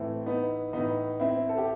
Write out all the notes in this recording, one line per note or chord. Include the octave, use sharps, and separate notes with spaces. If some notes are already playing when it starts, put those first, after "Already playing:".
Already playing: A2 E3 A3 C4
B3 D#4
A2 E3 B3 D#4
C4 E4
A4
G4